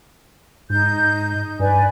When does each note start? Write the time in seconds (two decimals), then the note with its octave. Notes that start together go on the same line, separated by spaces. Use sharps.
0.70 G#2 D#4 G6
1.60 G2 B4 D5 G#5